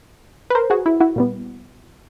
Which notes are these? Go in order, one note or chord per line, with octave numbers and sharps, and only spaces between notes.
B4
A#4 C5
F#4 G#4
E4
E4 F#4
A#2 G3 B3